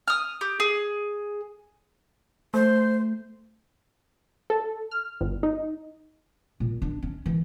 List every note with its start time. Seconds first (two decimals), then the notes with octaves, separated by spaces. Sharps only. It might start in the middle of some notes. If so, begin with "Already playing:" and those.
0.08 D#6 F6
0.41 G4
0.60 G#4
2.54 A3 C5
4.50 A4
4.91 F6
5.21 G1
5.43 D#4
6.60 A#2
6.82 D4
7.02 C#4
7.26 E3